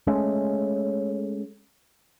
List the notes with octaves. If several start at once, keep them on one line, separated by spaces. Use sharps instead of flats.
G#3 A3 C#4